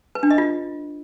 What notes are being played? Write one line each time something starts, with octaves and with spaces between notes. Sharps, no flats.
B4
D4
D#5
F4